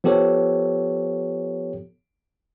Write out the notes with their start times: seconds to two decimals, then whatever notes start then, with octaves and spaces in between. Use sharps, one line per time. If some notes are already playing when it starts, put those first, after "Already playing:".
0.04 F3 B3 G4 A4 C#5